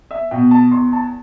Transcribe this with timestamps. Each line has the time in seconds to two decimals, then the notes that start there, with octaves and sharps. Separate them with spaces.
0.11 E5
0.31 B2 B3 G5
0.51 A5
0.71 E2 C6
0.93 A5